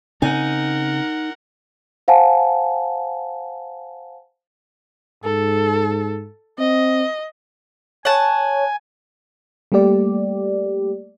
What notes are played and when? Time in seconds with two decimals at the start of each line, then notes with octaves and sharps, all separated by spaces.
0.22 C#3 C4 D#4 A#4 F#5 G#5
2.08 C5 F5 F#5 G#5 A5
5.24 G#2 A4
6.59 C4 D#5
8.05 C#5 F#5 G#5 A5
9.72 G3 A3 A#3 G4 D5